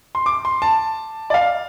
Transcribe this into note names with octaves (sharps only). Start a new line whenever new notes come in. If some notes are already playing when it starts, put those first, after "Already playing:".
C6
D6
C6
A5
D5
F5